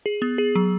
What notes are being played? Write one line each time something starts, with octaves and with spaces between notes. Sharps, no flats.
G#4
B3
G#4
F#3